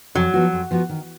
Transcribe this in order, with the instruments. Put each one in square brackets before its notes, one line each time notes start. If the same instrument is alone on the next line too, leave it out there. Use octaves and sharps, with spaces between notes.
[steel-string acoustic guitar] F2 [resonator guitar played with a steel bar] F#3
[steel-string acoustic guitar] F3 B3 F#4
F2
F3 B3 F#4
D#3